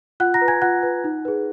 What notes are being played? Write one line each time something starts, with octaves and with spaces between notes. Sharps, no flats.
F4 F#5 F#6
A#5 A#6
B4
G#5 G#6
F4 F#5 F#6
B4
D#4
G#4 B4